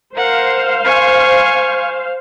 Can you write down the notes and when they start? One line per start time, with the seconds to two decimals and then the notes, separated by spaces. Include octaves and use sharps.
0.15 A#4 C5 F5 F#5
0.85 G#5 C#6